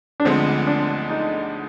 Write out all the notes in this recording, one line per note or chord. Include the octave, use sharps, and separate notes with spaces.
D4
D2 D3 F3 G#3 B3 C4
D4
D#4